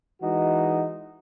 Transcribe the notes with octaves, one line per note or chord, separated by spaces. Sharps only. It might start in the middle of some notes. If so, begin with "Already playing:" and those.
E3 G#3 D#4 F#4